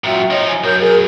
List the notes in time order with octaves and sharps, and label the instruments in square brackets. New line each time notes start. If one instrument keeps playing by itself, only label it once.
[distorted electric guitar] F#2 A#2 [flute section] F#4 E5 G5
[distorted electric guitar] F3 D#4 [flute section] C#5 D#5
[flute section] G#5
[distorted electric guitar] B1 F#2 [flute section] A#4 C#5 G6
[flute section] G#4 [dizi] A#4